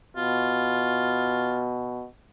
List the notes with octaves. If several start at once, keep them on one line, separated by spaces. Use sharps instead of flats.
B2 F4